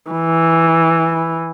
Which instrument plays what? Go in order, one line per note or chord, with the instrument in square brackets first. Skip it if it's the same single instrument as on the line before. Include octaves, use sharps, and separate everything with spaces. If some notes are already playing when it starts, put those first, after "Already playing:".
[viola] E3